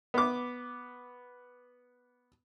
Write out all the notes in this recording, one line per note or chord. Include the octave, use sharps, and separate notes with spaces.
B3 D6